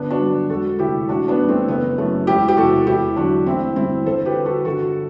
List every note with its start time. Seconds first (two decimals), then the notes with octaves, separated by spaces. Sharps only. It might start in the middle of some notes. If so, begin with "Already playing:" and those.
Already playing: G1 B3 D4
0.10 D4 F#4
0.20 G2 F#3
0.49 E1 F#4 A4
0.79 D2 C3 E4 G4
1.09 A1 D4 F#4
1.28 B3 D4
1.39 G2 E3
1.48 A3 C4
1.68 F#1 B3
1.98 F#2 E3 A3
2.27 E1 E4 G4
2.48 G4
2.57 E2 C3 F#4 A4
2.87 E2 E4 G4
3.16 D3 F#3 D4 F#4
3.46 A1 C4 E4
3.76 G2 D3 G3 C4 E4
4.06 G1 A4 C5
4.25 G4 B4
4.35 G2 E3 G3
4.45 F#4 A4
4.65 G1 F#4 A4